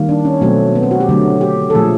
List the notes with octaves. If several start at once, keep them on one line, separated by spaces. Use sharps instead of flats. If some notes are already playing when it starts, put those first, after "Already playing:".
Already playing: D#3 G3 A#3
D4
C#4
B2 F#3 A3 C4
B3
C4
F#4
G4
D3 F#3 A3
G4
A4
A#2 F3 A3 G#4